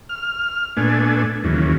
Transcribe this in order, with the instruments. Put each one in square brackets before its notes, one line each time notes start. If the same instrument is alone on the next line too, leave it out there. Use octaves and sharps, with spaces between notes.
[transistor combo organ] F6
A#2 A3 B3 D4 G#5
D#2 C#3 E3 F#3